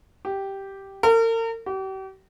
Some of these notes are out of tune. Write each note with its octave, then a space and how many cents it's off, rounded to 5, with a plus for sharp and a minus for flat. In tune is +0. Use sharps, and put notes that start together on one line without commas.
G4 -5
A#4 -40
G4 -40